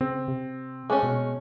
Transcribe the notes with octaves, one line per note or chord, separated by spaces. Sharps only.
C#3 C4
C3
G#3 A3 C#4
B2